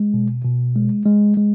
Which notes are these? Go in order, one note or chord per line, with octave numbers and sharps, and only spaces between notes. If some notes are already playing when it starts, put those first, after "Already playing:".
Already playing: G#3
B2
B2
G#3
G#3
G#3